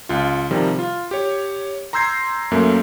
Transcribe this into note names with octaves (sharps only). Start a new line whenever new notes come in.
C#2 F4
C3 D#3 F3 G3
F4
G4 C#5
A#5 C6 E6 G6 G#6 C7
F#2 A3 A#3